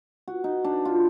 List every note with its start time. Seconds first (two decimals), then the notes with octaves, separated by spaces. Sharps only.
0.28 F#4
0.44 D#4
0.64 D4
0.85 F4